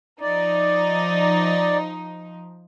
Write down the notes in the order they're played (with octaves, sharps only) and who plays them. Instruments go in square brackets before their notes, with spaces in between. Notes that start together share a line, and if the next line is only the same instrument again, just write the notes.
[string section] F3 D#4 [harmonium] D5